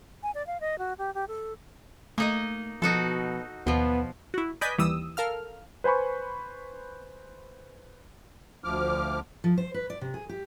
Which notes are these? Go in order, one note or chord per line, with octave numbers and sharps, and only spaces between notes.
G#5
D5
F5
D#5
F#4
G4
G4
A4
A3 A#3 D#4 D#5
B2 F3 D#4 F#4 A4
D#2 B2 F3 B3
E4 F#4
B4 D5 D#5 G#5 G6 B6
D#2 E3 G3 D#6 E6
A4 A#4 F5 F6
B4 C5 G#5 B5 C#6
D2 F3 D6 F6
F3
C5
B4
D5
C3
G#4
G4